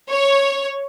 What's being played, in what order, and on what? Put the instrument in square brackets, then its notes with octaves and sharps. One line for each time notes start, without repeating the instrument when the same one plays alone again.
[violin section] C#5